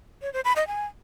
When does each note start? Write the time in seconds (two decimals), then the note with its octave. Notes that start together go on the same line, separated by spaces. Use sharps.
0.22 C#5
0.33 C5
0.45 B5
0.56 D#5
0.67 G#5